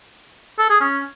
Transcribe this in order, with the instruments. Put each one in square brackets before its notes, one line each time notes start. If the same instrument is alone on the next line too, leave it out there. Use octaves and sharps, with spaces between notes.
[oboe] A4
G#4
C#4